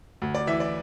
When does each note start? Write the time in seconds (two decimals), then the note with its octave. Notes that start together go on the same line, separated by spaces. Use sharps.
0.22 D2
0.35 D5
0.47 E3 E5
0.60 D5